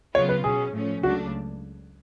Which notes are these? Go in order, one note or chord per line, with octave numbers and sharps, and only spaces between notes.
C#3 F#3 B3 F4 C#5
B4
B2 F#3 C#4 G#4
A2 F3 A3 C#4
C#2 C#3 F#3 A3 D4 F#4